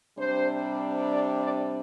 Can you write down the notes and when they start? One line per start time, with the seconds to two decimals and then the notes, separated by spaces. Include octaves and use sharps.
0.18 C3 G3 D4 C5
1.11 D5
1.42 D5